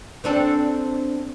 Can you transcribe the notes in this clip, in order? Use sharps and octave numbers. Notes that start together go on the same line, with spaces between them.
C4 D4 A4